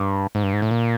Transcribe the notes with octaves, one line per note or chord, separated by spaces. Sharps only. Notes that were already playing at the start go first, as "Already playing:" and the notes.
Already playing: G2
G#2
G2
G#2
A2
A#2